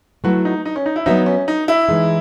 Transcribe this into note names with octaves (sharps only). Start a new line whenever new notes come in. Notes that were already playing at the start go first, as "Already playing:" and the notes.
F#3 A3 E4 F#4 B4
D#4
D#4
C#4
D#4
E4
F#3 B3 D#4 F#4 C#5 E5
C#4
D#4
E4
E3 G#3 D#4